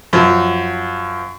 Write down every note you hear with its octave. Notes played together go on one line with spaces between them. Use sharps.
F#2 F3